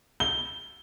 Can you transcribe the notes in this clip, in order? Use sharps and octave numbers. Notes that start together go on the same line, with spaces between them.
G7